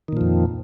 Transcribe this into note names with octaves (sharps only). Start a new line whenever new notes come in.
F2 A#2 D#3 F3